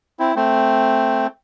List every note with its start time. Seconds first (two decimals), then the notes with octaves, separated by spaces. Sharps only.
0.19 C4 E4
0.36 A3 C4